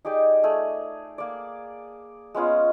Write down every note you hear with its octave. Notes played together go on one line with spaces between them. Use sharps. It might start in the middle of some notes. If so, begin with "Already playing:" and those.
D#4 G4 G#4 D5
A3 G#4
A#3 D5
G#3 B3 C#4 F4